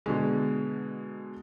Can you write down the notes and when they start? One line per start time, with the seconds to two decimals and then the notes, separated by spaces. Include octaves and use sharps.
0.06 B2 D3 G#3